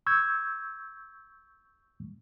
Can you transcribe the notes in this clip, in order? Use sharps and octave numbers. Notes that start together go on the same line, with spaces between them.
C#6 E6 G6 G#6